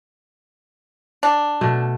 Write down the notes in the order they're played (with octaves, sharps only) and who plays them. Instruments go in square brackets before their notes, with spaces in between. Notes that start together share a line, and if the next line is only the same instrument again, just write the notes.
[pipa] D4
[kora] B2 A3